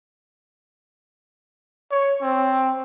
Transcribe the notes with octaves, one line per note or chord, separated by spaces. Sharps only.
C#5
C4